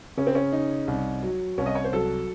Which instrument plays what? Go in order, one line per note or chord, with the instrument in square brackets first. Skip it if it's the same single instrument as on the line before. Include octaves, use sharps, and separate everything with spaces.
[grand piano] C#3 [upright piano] C#4
[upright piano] C4
C#4
[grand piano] D#4
C2
F#3
[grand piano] C2 [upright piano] C#4
[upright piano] D#5
C#5
C5
[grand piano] F#3 [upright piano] A4